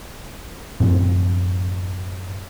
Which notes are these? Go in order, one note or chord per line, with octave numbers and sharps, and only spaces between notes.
F#2 A2 F3 C4